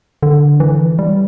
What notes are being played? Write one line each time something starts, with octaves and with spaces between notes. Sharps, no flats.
D3
E3
G3